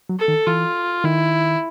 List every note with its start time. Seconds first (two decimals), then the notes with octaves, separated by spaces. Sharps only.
0.09 F#3
0.19 A4
0.28 D#3
0.47 E3 F4
1.04 D#3 E4